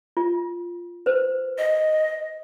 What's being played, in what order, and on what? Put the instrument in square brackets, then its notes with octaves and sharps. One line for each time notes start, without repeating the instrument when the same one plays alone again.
[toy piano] F4
B4 C5
[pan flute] D#5